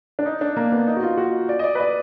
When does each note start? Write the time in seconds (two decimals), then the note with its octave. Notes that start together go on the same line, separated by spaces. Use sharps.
0.19 D4
0.26 D#4
0.41 D4
0.56 A#3
0.72 B3
0.87 D#4
0.97 F#4
1.03 F4
1.18 F#4
1.49 D5
1.59 D#5
1.64 D5
1.75 B4
1.80 D5